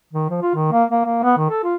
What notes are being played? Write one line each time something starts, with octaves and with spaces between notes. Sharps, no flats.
D#3
F3
F4
D#3
A#3
A#3
A#3
B3
D#3
A4
F4